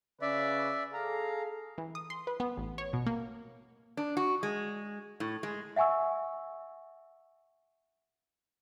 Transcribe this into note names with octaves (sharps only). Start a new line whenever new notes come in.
C#3 C#4 B4 D5 E5
G#4 A4 F5 A#5
E3
D#6
C6
B4
B3
A1
C#5
B2
A#3
D4
F#4
G#3
A2
G#3
E5 F#5 G#5 C#6 E6